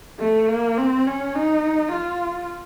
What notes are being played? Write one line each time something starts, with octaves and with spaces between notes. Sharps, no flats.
A3
A#3
C4
C#4
D#4
F4